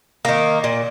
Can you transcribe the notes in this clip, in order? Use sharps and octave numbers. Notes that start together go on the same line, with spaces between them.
D#3 A#3
A#2